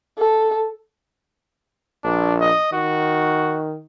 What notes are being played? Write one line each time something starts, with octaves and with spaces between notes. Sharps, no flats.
A4
A#1 D4
D#5
D#3 F#4